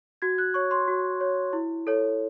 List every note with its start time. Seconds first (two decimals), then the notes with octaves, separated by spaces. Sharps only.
0.22 F#4 G#6
0.38 F#6
0.54 C#5 C#6
0.71 C6
0.88 F#4
1.21 C#5
1.53 E4
1.87 A4 C#5